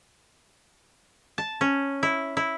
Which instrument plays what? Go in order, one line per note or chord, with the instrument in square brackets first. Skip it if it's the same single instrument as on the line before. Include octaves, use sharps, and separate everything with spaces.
[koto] A5
C#4
E4
E4